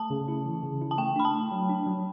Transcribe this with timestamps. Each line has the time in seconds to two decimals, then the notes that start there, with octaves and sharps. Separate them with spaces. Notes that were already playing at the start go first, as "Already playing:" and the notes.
Already playing: A3 A5
0.10 C#3
0.28 E4
0.46 E3
0.63 C#3
0.81 E4
0.91 A5
0.98 A3 G5
1.16 D4 B5
1.25 A5
1.34 A3
1.52 F#3
1.69 D4
1.87 F#3